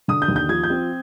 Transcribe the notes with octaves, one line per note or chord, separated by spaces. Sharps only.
D3 D#6
G6
D#2
G6
F3 G#6
G6
C4